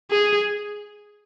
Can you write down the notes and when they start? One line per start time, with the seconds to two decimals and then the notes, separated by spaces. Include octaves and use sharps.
0.11 G#4